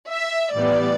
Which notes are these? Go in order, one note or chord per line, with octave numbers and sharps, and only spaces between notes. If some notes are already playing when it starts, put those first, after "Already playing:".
E5
A2 E3 G3 B3 D5